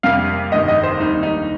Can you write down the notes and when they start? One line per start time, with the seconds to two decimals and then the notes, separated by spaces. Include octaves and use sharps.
0.03 F2 C3 G3 A#3 F5
0.52 G1 F2 C3 D#3 D#5
0.68 D#5
0.83 C5
0.99 D#2 D#3 G3 A#3 D#4
1.23 D#4